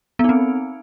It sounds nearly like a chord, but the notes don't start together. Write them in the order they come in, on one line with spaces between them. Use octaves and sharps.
B3 D#4 C4